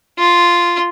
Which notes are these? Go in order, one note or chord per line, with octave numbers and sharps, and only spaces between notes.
F4